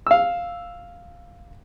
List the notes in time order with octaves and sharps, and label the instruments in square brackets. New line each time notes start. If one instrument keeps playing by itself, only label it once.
[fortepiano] F5 E6